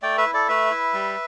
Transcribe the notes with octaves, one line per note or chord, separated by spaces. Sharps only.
A3 D5 G5
B4 E5
E4
A4 D5
A3 B4 E5
E4
G3